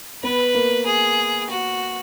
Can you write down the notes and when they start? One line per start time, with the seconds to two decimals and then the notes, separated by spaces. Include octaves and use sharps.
0.23 B3 B4
0.54 A#3
0.86 G#4
1.49 F#4